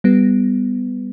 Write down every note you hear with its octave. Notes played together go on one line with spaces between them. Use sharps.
G3 B3